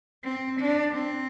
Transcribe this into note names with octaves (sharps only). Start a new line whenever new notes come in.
C4
D4
C4